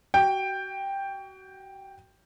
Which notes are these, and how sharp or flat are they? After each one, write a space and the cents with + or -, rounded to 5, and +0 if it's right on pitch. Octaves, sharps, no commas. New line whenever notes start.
F#4 +35 G5 +5